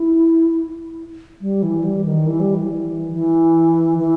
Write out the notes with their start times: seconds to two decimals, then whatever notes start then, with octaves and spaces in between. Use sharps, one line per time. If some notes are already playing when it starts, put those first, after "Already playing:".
Already playing: E4
1.41 G3
1.63 E3
1.84 G3
2.05 D#3
2.27 E3
2.40 G3
2.55 E3
3.13 E3
3.98 E3